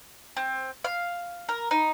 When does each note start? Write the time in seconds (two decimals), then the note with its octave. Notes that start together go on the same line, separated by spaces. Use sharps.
0.37 C4
0.84 F5
1.49 A#4
1.71 D#4